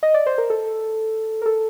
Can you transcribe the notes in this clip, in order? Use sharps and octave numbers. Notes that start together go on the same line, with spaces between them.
D#5
D5
C5
A#4
A4
A#4
A4